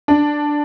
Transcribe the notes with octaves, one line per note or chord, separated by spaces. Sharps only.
D4